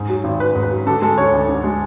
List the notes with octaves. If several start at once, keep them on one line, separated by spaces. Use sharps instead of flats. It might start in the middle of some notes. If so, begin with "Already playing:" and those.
Already playing: G#2
F#3
G#1
G#1 B4
G#2
B4
F#3
D3 A4
G#3 A4
D2 C#5
D2
D3
G#3